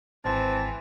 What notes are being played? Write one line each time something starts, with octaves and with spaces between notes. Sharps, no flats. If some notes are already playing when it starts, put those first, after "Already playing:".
G#1 E3 C4 A5